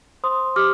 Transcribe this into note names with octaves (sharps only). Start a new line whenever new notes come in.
C5 C6 D#6
G4 D6 F6